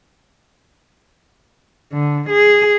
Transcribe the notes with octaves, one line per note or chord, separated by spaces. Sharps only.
D3
G#4